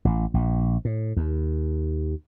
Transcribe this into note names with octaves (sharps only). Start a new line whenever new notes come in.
A1
A#1
A2
D#2